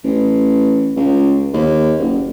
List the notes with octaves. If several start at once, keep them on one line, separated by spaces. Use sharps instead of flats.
A1
C#2
D#2
F#1